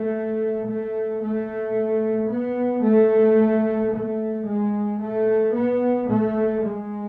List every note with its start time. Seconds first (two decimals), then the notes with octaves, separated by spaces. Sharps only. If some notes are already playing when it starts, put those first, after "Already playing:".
Already playing: A3
0.67 A3
1.21 A3
2.29 B3
2.83 A3
3.91 A3
4.45 G#3
5.00 A3
5.53 B3
6.08 A3
6.62 G#3